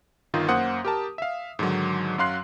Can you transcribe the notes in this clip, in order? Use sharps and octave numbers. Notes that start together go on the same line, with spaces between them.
G1 D#3 D#4 F4
F#2 A#3 C5 F#5 D#6
G4 A#4 A5
E5 F5
G#2 D3 D#3 F#3
F#2 F#3 F5 C6 F#6 C7